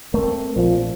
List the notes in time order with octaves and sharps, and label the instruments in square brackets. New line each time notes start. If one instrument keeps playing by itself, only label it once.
[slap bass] A3 C4 [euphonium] A#4
[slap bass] A#1 [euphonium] F3